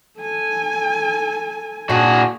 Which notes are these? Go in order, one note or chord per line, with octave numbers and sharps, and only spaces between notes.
A4 G#5
A#2 D4 F#4 G#4